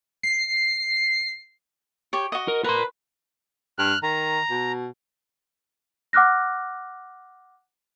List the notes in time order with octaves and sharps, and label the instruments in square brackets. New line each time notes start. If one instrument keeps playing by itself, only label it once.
[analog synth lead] C7
[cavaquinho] G4 C#5
F#4 D#5
[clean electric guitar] A#4
[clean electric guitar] A#4 C6 [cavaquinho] B4
[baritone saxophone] G2 [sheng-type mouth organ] F6 F#6
[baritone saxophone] D#3 [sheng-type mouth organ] A#5
[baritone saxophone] B2
[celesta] F#5 D6 F6 F#6 A#6